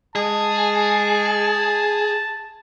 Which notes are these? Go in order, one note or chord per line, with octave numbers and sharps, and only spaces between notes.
G#3 G#4 A5